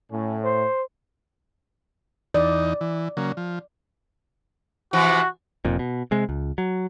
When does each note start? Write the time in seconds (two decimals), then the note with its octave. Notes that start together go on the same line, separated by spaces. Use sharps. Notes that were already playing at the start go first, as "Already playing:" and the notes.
0.12 A2 C#4
0.44 C5
2.34 E2 D#4 D5
2.81 E3
3.17 C#3 F#3 A#3
3.37 F3
4.93 C3 E3 F3 F#4
5.65 F1 F2 A#2
5.79 B2
6.11 C3 G#3
6.29 C#2
6.58 F#3